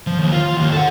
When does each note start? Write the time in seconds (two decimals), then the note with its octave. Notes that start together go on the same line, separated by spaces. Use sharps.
0.07 F3
0.20 D#2
0.32 F4
0.57 D#2
0.72 A4 F#5